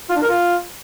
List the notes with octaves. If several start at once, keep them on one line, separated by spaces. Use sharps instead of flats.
F4
D4
A#4
F4